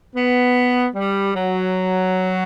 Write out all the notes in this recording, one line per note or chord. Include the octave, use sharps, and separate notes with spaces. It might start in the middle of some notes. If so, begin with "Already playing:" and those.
B3
G3
F#3